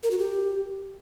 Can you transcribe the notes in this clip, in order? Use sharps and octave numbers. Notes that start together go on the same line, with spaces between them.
A#4
F#4
G4